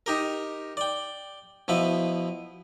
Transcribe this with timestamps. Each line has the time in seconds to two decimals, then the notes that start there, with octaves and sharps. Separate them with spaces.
0.06 D#4 G4 A#4
0.77 D5 G5
1.68 B2 F3 E4 B4